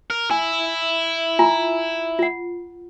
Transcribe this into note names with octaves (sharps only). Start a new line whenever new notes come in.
A#4
E4 G#5
F4 G#5 A#5
F4 F#5